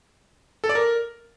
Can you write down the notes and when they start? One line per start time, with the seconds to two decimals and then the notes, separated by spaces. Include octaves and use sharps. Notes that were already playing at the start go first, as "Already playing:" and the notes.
0.64 A4
0.69 D5
0.75 A#4